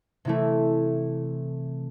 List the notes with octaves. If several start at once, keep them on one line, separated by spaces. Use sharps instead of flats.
C3 E3 A3 E4